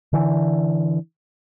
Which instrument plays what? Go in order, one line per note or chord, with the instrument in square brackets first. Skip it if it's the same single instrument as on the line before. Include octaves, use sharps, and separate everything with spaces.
[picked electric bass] D3 E3